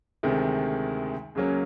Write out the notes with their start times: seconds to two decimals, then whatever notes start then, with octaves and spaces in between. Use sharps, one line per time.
0.23 D2 C3 D#3 G#3
1.35 C#2 C#3 F#3 A#3 C#4